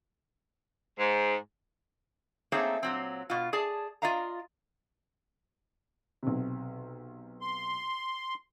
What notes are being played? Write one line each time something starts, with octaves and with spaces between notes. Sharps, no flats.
G#2
A3 A#3 C4 D#4 G#4 C#5
A#2 F#3 C4
B2 F4
G#4 D5 A5
F4 D5 D#5 F5 A#5
B1 C3
C6